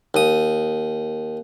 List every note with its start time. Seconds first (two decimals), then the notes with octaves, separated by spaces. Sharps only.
0.14 D#2 D#6